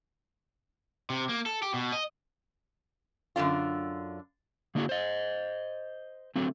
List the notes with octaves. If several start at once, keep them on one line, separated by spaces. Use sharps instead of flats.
C3
A#3
A4
G4
B2
D#5
F#2 D3 D4 F4
D3 A#3 D4 E4 F#4 G#4
C5 D#5
D3 F#3 A3 C4